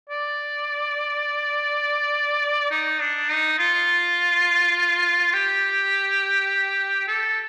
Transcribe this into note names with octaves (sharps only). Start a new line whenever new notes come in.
D5
D#4
D4
D#4
F4
G4
A4